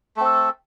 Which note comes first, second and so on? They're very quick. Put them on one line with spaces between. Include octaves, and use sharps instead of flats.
A3 C4 A4